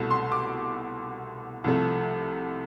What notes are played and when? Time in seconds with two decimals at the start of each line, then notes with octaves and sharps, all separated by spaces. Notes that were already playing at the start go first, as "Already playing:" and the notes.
Already playing: C2 B2 A3
0.10 C6
0.32 D6
1.64 C2 C3 F3 A3